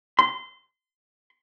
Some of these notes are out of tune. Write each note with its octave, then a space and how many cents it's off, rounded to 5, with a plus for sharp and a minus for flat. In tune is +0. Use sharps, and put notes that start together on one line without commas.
C6 -25